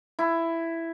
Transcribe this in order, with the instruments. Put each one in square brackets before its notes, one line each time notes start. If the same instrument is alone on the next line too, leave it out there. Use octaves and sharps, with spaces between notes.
[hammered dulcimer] E4